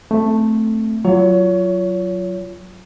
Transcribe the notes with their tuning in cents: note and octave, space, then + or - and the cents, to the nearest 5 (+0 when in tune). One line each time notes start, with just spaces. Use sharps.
A3 +0 C4 -5
F#3 +0 F4 -10 C#5 +25